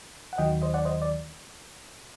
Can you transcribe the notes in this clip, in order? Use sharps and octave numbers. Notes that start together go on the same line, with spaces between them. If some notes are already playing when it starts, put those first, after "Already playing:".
F#5
D#2 D#3 F#3 D#5 G5
C5 D#5
D5 F#5
C5 D#5
D5